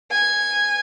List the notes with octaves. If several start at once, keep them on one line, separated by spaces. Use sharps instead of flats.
G#5